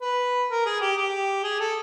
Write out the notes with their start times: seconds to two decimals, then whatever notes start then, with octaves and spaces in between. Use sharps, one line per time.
0.01 B4
0.50 A#4
0.65 G#4
0.80 G4
0.96 G4
1.43 G#4
1.60 A4